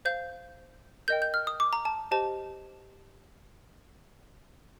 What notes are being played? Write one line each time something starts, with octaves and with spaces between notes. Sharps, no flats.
C5 F5 G6
A#4 D#5 G5 G6
G6
F6
D#6
D6
A#5
A5
G4 C5 D#5 A5